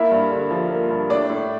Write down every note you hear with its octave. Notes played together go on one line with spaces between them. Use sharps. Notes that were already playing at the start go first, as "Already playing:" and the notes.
Already playing: A#3 E4 E5
G2
D3
F3
A#3
G2
A2 D4 D5
A2